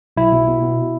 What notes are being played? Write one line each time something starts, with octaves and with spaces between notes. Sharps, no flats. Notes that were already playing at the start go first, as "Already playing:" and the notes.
B1 E4
B2
B2
B2